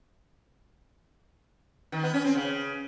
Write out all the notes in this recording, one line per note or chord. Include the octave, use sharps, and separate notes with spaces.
D#3
B3
C#4
C4
C#3